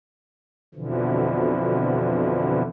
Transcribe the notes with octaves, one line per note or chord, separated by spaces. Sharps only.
F2 B2 D3 E3 F3